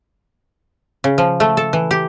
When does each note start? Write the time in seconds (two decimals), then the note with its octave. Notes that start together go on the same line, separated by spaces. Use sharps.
1.04 C#3
1.18 F3
1.40 A3
1.57 A4
1.73 E3
1.91 G4